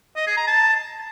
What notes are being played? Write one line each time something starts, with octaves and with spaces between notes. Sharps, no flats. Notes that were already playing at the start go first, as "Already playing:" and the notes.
D#5
G#4
A#5
A5